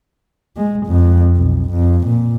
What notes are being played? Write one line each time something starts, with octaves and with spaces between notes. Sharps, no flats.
G#3
F2
B1
F2
A#2